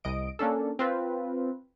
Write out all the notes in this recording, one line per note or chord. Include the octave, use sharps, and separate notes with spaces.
C2 D#5 D7
A#3 C#4 D4 A4
C4 F4 B4